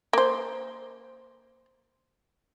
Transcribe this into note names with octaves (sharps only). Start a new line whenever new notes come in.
A#3 C5